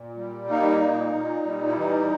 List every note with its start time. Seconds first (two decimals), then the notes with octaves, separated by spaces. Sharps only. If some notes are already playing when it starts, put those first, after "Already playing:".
Already playing: A#2
0.17 G3
0.48 A#3 D#4
0.81 A#2
1.13 A#2
1.45 G3
1.67 E4
1.77 E3 D#4